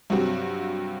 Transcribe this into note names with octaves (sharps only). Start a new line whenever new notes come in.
G2 C3 F#3 C4 F#4